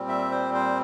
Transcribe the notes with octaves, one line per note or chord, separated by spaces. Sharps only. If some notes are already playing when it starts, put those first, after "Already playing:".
Already playing: A#2 G3 C4
E5
C5
C5